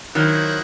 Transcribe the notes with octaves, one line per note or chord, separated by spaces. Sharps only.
D#3 F#3 E4 C5 D#5 F#5